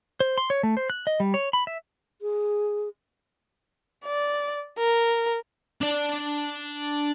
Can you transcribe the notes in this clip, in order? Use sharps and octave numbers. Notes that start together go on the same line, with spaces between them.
C5
C6
C#5
A3
C5
F#6
D#5
G3
C#5
B5
E5
G#4
D5
A#4
D4 D5